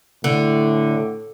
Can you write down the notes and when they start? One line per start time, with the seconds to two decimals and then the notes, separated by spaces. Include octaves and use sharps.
0.24 A2 D3